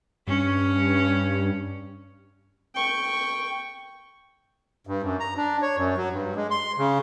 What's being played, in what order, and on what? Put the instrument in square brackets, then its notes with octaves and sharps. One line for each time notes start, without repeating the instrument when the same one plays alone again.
[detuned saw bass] G2 [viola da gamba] C#4
[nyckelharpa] G5 C#6
[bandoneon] G2
F#2
A#5
D4
C#5
F#2
F#3
G2
G#3
C6
C#3